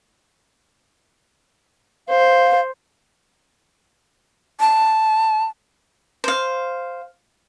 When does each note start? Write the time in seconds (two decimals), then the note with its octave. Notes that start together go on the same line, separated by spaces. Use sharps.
2.08 C5 F5
4.60 A5
6.24 C5 F5